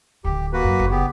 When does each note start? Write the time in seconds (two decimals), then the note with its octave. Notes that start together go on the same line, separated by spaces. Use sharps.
0.24 D1 D3 G4
0.53 A#3 F#4 B4
0.64 F#2
0.79 F#1 E3
0.91 B3 G4